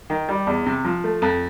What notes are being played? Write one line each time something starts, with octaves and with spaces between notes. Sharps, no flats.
D#3
G3
E2
C3
F3
A3
F2